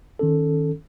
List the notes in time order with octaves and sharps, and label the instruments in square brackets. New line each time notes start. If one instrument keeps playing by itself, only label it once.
[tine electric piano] D#3 C#4 A4